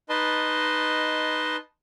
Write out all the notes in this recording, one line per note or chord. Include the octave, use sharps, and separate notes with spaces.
D#4 B4 D#5 A5 C6